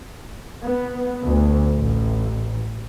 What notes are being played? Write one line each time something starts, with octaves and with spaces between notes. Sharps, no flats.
B3
D2
A1